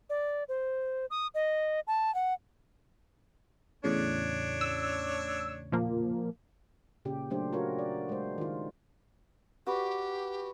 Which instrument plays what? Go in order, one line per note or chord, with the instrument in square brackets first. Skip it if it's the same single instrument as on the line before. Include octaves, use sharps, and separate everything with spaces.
[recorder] D5
C5
D#6
D#5
A5
F#5
[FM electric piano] E2 A2 C#3 [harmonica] D4 C#5
[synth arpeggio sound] E6
A#2 F3 A#3
[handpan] A#2 C#3 G4
F#3 A3 D4 G4 C5
F4 F#4 A#4 C#5
D5
G#3 C5
D#3 F4
[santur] F#4 B4 D5 [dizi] G4